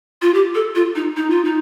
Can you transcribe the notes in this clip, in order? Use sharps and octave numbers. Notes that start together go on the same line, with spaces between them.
F4
G4
A4
F4
D#4
D#4
F4
D#4